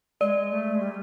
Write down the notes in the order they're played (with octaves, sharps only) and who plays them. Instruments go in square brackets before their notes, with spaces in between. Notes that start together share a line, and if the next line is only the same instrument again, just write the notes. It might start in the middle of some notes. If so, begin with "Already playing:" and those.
[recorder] G#3 [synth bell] D5
[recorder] A3
G#3
G3